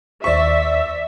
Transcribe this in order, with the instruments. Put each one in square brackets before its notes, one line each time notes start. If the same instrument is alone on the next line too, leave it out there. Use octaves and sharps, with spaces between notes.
[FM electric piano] D#2 C5 B6 [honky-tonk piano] D5 C#6 [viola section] E5